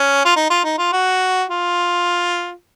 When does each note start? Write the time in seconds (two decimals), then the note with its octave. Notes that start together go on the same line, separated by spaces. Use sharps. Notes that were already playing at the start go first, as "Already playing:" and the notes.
Already playing: C#4
0.26 F4
0.36 D#4
0.50 F4
0.64 D#4
0.78 F4
0.93 F#4
1.49 F4